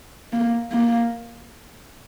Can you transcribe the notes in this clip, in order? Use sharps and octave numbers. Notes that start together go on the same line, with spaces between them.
A#3
A#3